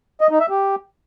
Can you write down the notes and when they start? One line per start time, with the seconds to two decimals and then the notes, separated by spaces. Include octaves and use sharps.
0.21 D#5
0.31 D#4
0.40 E5
0.50 G4